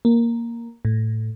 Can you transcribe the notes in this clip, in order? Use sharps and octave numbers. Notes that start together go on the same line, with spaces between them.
A#3
A2